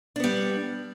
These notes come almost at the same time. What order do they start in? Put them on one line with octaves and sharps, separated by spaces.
D4 B3 G3